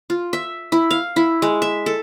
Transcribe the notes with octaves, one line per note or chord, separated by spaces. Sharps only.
F4
E5
E4
F5
E4
G#3
E5
A4